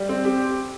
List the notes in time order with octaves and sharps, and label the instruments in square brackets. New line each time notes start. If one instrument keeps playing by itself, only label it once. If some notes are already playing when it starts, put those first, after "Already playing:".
Already playing: [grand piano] G3
C4
G4